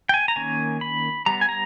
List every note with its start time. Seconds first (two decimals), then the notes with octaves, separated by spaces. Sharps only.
0.09 G5
0.14 G#5
0.28 A#5
0.36 D#3 A#3 C#4 G#5
0.81 B5
1.26 G3 B3 A#5
1.41 G#5
1.49 A#5